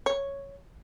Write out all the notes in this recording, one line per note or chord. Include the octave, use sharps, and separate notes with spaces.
C#5